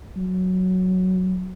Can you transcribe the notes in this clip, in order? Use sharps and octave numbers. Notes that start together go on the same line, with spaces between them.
F#3